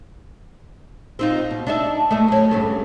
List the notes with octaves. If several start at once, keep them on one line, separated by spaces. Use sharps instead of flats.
C4 D#4 F4
B2
D4 D#4 E5
A3 D#5 E5
F#3 C#4
G2 C#3 A3